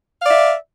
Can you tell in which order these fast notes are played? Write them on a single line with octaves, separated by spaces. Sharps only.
F5 D5 E5